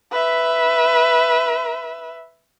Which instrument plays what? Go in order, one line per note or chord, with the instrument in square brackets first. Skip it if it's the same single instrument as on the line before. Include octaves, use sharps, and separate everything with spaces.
[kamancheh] B4 E5